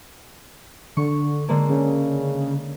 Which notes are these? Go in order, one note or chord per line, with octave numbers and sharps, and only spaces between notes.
D3 C#6
D3 G#3 A#3
C#3